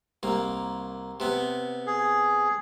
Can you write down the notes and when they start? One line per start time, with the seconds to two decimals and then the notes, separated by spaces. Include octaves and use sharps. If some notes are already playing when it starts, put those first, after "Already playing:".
0.23 C2 A#3
1.20 C3 B3
1.87 G#4